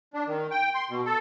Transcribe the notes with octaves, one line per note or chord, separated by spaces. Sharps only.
D4
D#3
G5
C6
B2
A4